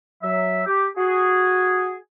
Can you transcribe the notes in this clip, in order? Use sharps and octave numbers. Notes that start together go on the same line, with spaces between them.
F#3 E5
G4
F#4 G#4